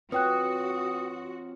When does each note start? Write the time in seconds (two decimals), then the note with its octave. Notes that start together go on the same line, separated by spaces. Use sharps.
0.12 C4 F4 F#4 B4 C#5 G5 D#6 F#6